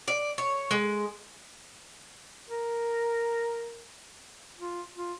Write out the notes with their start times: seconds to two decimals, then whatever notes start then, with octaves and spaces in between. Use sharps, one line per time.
0.08 D5
0.38 C#5
0.71 G#3
2.48 A#4
4.58 F4
4.95 F4